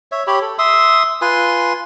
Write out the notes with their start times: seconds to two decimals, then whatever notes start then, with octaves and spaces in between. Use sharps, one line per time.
0.12 C#5 E5
0.27 G4 C#5 B5
0.42 A4
0.59 E5 C6 D#6 E6
1.22 F4 B4 G#5 C6